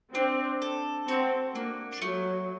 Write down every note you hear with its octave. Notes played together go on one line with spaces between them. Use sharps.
C4 D4
A4
C4 F#4
A#3 D4
F#3 A3